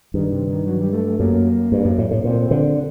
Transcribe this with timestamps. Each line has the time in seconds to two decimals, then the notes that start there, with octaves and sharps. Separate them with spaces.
0.14 G2 D#3
0.31 C3
0.48 D#3
0.66 F#3
0.80 G3
0.93 A3
1.06 A3
1.19 F#2 A#3
1.72 G2
1.85 F#2
1.98 A2
2.11 A2
2.24 A#2 C4
2.51 D3